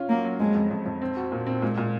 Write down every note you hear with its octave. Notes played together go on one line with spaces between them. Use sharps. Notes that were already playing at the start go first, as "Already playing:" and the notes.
Already playing: C#4 F4
F#3 A#3
F#3
F2 G#3
F2
F2
F2
C4
F#4
A#2
C4
A#2 G#3
A#2